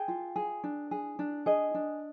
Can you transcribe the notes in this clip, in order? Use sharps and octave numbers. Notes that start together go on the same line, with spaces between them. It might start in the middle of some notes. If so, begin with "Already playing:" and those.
Already playing: G#4 G5
F4
G#4
D4
G#4
D4
G#4 D#5
D4